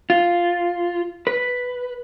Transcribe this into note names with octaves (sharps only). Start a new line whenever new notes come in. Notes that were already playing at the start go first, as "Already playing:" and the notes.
F4
B4